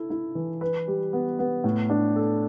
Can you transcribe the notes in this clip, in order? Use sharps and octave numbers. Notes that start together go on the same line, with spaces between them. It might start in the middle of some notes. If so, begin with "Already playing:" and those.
Already playing: E4 A4
E4
E3
B4
G3
B3
B3
A2
D4
A4